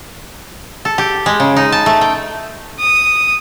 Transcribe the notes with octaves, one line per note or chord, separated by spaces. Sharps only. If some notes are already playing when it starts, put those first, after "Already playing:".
A4
G4
G#3
C#3
D#4
A5
A3
G5
D#6